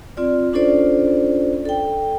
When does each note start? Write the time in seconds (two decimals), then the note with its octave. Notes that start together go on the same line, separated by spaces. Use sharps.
0.17 C4 F4 D5
0.53 C#4 D4 F4 A4 C5 D5
1.65 A4 G5